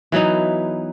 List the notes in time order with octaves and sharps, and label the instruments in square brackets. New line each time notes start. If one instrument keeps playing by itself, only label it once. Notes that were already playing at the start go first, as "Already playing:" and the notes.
[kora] E3 F#3 B3 D#4